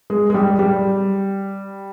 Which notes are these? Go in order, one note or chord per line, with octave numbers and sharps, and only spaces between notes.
G#3
G#3
G3
G3